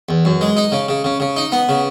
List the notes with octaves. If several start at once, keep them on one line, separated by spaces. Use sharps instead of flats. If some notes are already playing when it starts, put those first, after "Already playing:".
E2
F#2
G#3
D#4
C#3
C#3
C#3
C#3
D#4
B3
C#3